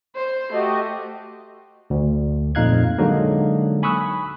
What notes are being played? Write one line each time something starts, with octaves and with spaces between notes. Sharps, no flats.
C5
A3 F#4 G4 D#5
D2
F2 A#2 D#4 F5 F#6 G#6
D3 F#3 G#3 A#3 D#4
G#5 B5 C#6 D#6 E6 F#6